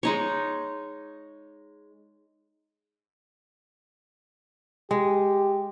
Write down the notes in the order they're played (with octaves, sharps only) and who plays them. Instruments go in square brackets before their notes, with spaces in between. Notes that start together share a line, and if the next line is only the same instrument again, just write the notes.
[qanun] G#3 D#4 C#5
[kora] G#3 [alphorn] G4